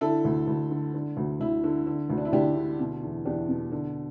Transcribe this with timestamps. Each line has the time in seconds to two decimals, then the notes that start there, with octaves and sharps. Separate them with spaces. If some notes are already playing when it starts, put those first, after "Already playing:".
0.01 D3 E4 A4
0.25 D2
0.47 D2
0.70 D3
0.94 D3
1.17 D2
1.40 D2 E4
1.64 D3
1.87 D3
2.10 D2
2.17 D4
2.25 E4
2.32 D2 D4 G4
2.56 D3
2.80 B2
3.03 E2
3.25 E2 D4 G4
3.49 B2
3.72 D3